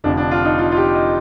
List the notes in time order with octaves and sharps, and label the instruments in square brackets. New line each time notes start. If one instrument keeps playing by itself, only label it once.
[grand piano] F1 F2 D3 F3 D4
D4
F4
D#4
F4
F4
G4
D#5